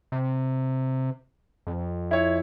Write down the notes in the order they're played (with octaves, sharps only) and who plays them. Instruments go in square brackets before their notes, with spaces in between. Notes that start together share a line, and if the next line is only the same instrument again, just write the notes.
[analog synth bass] C3
F2
[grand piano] E4 C#5